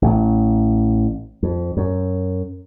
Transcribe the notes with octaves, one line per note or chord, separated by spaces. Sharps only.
A1
F2
F#2